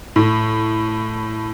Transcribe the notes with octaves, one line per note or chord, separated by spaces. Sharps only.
A2